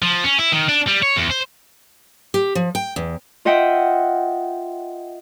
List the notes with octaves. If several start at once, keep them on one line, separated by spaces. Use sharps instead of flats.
F3
C#4
E4
D#3
D4
G3
C#5
E2
C5
G4
F3
G5
E2
F4 D#5 E5 F#5 G5